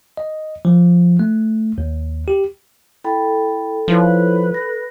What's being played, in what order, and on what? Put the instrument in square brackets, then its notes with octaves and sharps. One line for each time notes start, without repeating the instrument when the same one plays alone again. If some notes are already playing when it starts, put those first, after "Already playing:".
[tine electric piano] D#5
F3
A3
D#2
G4
[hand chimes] E4 G5 B5 [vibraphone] A4
[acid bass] F3 [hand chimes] D#4 E4 C#5 [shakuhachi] B4
[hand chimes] A#6